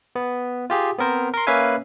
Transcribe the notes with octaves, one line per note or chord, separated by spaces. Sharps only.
B3
F4 G4 G#4
B3 C4 A#4 C5
A#4 C6
A#3 C#4 B4 E5 F5 G#5